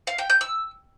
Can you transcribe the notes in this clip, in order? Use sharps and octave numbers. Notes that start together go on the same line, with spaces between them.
F5
G5
G6
E6